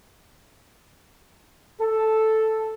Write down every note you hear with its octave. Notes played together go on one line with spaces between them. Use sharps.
A4